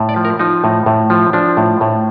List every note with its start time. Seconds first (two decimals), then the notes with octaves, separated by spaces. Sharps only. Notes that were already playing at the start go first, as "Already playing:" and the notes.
Already playing: A2
0.09 D5
0.16 F3
0.25 A#4
0.39 F3 D#4
0.64 A2
0.86 A2
1.10 F3
1.33 F3 D4
1.57 A2
1.81 A2